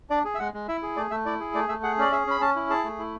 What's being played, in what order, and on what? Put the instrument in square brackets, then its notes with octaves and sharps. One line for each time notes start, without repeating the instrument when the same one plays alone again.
[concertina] D4 D5
G#4
E5
G#3 F#5
G#3
E4 E5
G#4
A3 D5
A3 E5
E4 D5
G#4
A3 D5
A3 E5
G#4 F#5
C#4 D5
G#4 E5
C#4 B5
C#4 A5
E4
G#4 A5
A3
E4